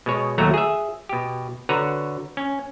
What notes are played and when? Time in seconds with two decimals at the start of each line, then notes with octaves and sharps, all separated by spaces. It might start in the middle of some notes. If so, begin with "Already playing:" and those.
0.06 B2 G#3 C#5
0.38 D#2 F#3 A3 F#4 A#5
0.54 G#4 E5
1.09 B2 G4
1.69 D3 F#4 B4 C#5 A#5
2.37 C#4